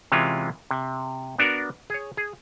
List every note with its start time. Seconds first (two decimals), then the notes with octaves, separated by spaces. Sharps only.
0.12 C3 E3 G#3 C#4 F4
0.71 C3
1.38 B3 D4 F#4 A#4
1.90 G#4 C#5
2.17 G#4